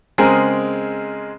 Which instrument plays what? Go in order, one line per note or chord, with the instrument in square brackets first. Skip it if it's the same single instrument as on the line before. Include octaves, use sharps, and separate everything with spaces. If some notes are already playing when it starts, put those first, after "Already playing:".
[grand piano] C#3 G#3 C4 G#4 A#4